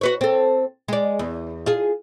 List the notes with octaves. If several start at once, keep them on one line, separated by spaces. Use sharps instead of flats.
F#4 B4 C#5
C4 A4
G#3 D5
E2
F4 G#4